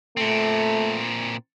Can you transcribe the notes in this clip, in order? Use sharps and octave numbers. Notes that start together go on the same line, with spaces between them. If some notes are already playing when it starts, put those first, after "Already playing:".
A#2 A3 C4